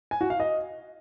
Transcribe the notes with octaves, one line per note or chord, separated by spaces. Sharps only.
G#5
F#4
F5
D#5